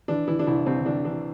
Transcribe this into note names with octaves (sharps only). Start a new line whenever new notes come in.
E3 D4
E3 E4
D4
C2 E4
C2 C4
E3 D4
E3 D4